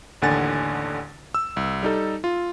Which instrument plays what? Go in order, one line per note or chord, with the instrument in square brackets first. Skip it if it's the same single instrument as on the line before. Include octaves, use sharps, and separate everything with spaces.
[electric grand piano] A1 D#2 D3 F#5 G#5 A6
E6
C2
G3 D#4 A4
F4